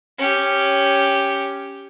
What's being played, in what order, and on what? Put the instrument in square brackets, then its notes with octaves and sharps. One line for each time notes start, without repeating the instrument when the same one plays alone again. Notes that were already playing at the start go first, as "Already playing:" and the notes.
[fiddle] C#4 G4